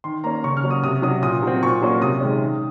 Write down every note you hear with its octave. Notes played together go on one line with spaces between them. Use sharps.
D#3 C6
A#3 C#4 A#5
C#3 C#6
F6
F#3 A#3 C#4
D#6
C3 D#6
F#3 C#4 D#6
A#2 D#6
F#3 C4
A#2 C#6
F#3 A#3 C#4
C3 D#6
D#3 G#3 C#4
D#3